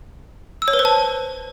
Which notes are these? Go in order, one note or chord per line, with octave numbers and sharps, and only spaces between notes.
E6
C#5
B4
C5
A5